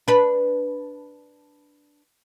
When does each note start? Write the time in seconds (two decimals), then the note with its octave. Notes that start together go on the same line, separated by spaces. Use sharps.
0.08 D4 B4